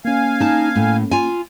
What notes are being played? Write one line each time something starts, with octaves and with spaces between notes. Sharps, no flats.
A#3 C#4 F5 G#5
D#4 A5
A2
F4 G#5